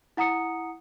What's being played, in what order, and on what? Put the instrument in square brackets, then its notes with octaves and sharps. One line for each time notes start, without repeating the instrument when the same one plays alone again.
[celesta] E4 F#5 A#5 D#6 C#7